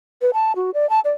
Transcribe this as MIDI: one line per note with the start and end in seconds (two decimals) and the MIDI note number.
0.22 0.31 71
0.34 0.52 81
0.56 0.71 66
0.74 0.89 74
0.90 1.00 81
1.05 1.12 74